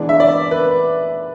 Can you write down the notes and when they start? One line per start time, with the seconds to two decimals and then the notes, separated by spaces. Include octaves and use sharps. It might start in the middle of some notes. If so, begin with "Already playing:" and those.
Already playing: E3 G#3 B3 D4
0.09 E5
0.20 D5
0.51 B4